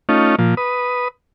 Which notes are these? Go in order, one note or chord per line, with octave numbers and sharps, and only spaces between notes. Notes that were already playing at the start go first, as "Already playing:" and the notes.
A3 C#4 D#4 F4
A#2 F3
B4 D#6